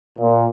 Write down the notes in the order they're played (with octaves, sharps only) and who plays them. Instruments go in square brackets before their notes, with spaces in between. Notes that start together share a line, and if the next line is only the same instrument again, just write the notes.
[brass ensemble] A#2